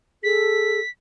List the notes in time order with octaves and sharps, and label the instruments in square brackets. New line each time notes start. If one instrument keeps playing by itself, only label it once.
[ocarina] G#4 [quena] A4 [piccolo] B6